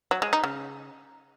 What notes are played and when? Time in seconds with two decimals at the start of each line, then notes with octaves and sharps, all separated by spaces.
0.11 F#3
0.22 G#3
0.33 D#4
0.44 C#3